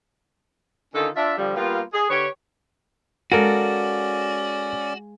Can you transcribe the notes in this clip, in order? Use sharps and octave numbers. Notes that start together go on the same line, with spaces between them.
D3 D#3 C#4 D#4 F4 A4
D4 F4 E5
D3 F3 G3
G3 A#3 B3 F4
G#4
D3 G4 B4 C#5
G#3 C#4 F#4 A4 A#4 D5 F5 G#5